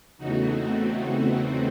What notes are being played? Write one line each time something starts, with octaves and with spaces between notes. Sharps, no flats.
E2 C#3 E3 A3 D#4 F#4
C4
C4